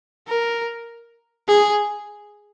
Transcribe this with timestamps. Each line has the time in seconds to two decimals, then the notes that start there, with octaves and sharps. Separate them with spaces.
0.28 A#4
1.48 G#4